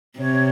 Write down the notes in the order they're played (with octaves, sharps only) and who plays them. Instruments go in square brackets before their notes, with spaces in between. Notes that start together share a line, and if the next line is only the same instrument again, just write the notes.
[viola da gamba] C3 [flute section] C#5